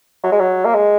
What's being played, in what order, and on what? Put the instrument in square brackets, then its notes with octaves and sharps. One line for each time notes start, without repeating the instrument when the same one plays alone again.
[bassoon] F#3
G#3
F#3
A#3
G#3